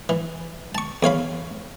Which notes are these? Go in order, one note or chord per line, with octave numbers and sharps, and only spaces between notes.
E3
A5 C#6
E2 C#5 F5 B5